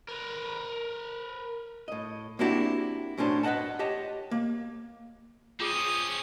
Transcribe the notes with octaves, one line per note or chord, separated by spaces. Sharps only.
A#4 B4
A2 D#5
A#3 C4 D4 E4 F#4 G4
F#2 A2 C#4 D4 C5
B4 C5 D#5 F#5 A5
G4 C#5 D#5 A5
A#3
C4 C#4 F4 G#4 D#6